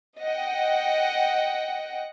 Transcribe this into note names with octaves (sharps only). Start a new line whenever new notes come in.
D#5 F#5 G5